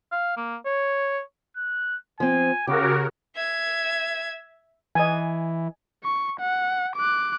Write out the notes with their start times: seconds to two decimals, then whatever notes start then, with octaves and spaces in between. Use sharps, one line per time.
0.12 F5
0.37 A#3
0.66 C#5
1.57 F#6
2.20 F3 C4 G#5
2.67 C#3 F#4 G4 A#4 D6
3.36 E5 G#6
4.95 E3 D#5 G#5
6.04 C#6
6.40 F#5
6.96 D6 F#6